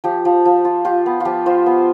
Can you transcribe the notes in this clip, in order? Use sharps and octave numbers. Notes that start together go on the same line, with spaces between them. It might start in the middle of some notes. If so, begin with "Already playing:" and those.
F3 G4
F3
F3
F4
F4 G4
B3
F3 F4 G4
F4 C5
B3